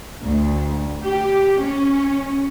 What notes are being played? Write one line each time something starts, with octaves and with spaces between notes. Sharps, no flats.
D2
G4
C#4